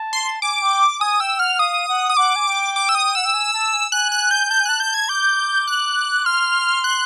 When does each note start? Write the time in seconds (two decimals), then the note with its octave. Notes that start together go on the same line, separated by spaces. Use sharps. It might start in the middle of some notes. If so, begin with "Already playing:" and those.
Already playing: A5
0.13 C6
0.42 G#5 D6
0.62 G5
1.00 G#5 D#6
1.20 G5 E6
1.39 F#5 F6
1.59 F5 D#6
1.89 F#5
2.09 D#6
2.17 F#5 D6
2.36 G#5
2.47 G5
2.76 D6
2.89 E6
2.95 D#6
3.15 F#5 E6
3.26 G5
3.34 G#5
3.53 A5
3.73 G#5
3.92 G#5 F#6
4.12 F#6
4.31 G6
4.50 A5 G6
4.60 G#5
4.65 A5 F#6
4.80 G6
4.94 G#6
5.09 D6 G6
5.67 F#6
6.25 C6 F6
6.84 F#6